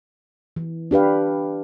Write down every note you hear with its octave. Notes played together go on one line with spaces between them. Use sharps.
E3
D4 G4 B4 F5